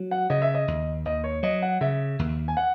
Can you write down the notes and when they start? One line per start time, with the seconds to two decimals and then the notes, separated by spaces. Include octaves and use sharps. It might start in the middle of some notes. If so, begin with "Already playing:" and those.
Already playing: F#3
0.11 F#5
0.30 C#3 D#5
0.42 E5
0.54 D#5
0.68 D#2
1.05 D#2 D#5
1.24 C#5
1.43 F#3 D#5
1.62 F#5
1.81 C#3 E5
2.19 D#2
2.48 G#5
2.57 F#5